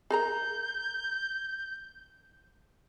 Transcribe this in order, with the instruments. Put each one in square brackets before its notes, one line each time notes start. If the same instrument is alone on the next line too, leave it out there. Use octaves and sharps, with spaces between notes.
[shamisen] G#4 A#4 A#5 [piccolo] G6